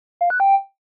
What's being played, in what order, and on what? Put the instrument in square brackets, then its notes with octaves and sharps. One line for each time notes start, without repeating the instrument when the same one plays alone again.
[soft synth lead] F5
F#6
G5